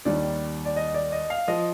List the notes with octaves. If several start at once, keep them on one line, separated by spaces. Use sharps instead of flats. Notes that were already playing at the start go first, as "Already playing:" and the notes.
D#2 D#3 G3 D5
D5
D#5
D5
D#5
F5
F3 D#5